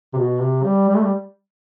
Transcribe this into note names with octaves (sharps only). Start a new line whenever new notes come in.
C3
B2
C3
G3
G3
A3
G3